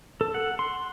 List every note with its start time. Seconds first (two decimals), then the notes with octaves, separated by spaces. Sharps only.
0.21 A4
0.34 F#5
0.59 C6